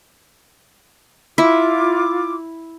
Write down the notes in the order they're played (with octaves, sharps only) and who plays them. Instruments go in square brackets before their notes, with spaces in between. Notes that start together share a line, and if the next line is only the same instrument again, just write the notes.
[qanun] E4 [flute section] F4 D6